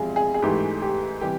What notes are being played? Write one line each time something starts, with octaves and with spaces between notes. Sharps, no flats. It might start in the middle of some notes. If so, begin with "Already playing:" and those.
Already playing: E2 C3 F3 G#3 G#4
G#4
G#4
G#2 E3 A3 G4
G4
C3 E3 G3 G4